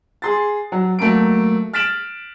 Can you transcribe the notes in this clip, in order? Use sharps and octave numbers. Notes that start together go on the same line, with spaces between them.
G#4 C6 A6
F#3
F#3 A3 A#3 D7
F6 A6 B6 D7 E7 F#7